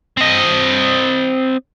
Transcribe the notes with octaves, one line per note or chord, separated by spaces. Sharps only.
C4 D#5